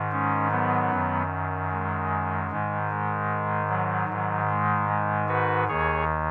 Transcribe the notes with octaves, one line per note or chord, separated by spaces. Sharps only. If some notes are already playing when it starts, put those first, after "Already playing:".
Already playing: G#2 D#3
G#3 C#4
F#3 B3
F#2 D#3
G#3
G#2 D#3
G#3
F#3
G#2 D#3
G#3
G#3
F#4 B4
D#2 D#3 G#4 C#5